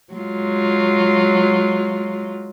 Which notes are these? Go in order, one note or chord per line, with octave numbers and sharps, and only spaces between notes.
F#3 G#3 F4